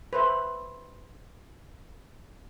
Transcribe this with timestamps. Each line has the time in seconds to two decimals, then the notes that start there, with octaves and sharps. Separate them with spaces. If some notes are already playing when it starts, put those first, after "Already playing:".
0.13 B4 C5 E5